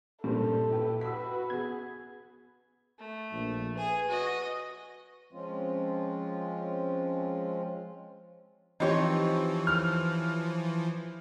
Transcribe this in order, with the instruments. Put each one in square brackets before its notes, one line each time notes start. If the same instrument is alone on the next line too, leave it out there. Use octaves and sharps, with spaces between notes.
[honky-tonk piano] G2 G3 C5 [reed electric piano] A#2 [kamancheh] A4
[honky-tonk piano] E4 G4 B4
[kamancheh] F#4 B4 [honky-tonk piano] E6 B6
[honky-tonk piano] B3 G#4 [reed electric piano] G#6
[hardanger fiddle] A3
[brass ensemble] A#1
[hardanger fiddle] G#4 G#5 [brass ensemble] B4
[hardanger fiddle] F#4 D#5
[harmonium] F3 G#3 C4 C#4 F4
[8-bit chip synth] E3 F3 [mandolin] C4 C#5 [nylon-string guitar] D#4 G4
[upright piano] F6